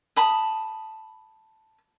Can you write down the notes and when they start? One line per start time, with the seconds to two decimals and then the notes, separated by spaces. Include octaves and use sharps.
0.16 A5 B5 D#6